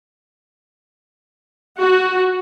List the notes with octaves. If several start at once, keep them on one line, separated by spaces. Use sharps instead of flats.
F#4